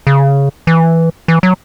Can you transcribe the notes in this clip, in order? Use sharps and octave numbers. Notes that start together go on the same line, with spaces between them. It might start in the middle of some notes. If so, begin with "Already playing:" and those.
C#3
E3
E3
F#3